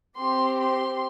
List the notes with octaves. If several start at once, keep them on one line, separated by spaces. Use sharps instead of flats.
C4 G4 C6
C6